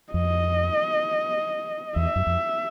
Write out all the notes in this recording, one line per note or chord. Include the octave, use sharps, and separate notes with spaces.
F2 D#5
E2 E5
F#2
F2